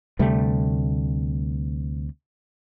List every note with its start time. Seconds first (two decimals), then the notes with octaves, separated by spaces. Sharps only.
0.19 D2 C3 G3 A3